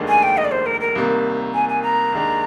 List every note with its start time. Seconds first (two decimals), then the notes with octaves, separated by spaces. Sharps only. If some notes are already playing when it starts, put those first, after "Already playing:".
Already playing: F1 D#2 D#3 G#3 D4
0.08 G#5
0.23 G5
0.37 D#5
0.45 D5
0.52 C5
0.66 A#4
0.81 A#4
0.95 C2 C3 D#3 A#3
1.54 G#5
1.69 G#5
1.83 A#5
2.12 D#2 D#3 G#3 D4